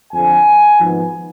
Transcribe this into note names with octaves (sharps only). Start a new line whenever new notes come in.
F2 D3 F3 G#5
G#1 G#2 F3 G#3 B3